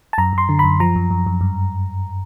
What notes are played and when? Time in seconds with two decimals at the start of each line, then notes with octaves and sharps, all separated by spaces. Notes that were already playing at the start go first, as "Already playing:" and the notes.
0.13 A5
0.18 F#2 A#5
0.33 F#2 C6
0.49 D3
0.59 F#2 B5
0.80 F3 A#5
0.96 F#2
1.11 F#2
1.26 F#2
1.41 G2